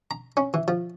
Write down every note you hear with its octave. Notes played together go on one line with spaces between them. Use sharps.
A#5
C#4
E3
F3